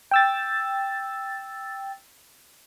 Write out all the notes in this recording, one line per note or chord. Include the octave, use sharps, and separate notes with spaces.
G5 E6 A6